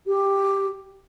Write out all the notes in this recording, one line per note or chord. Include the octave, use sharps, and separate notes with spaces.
G4